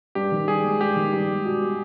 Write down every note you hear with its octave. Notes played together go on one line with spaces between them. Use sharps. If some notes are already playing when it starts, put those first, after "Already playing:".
G2 G4
D#3
G2 G#4
G#3
G2 G4
D#3
G2
G#3
B2
G3